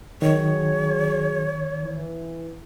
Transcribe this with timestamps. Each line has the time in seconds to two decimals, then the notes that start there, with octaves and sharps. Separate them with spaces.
0.22 D#3 F#3 G#4 C#5
1.82 E3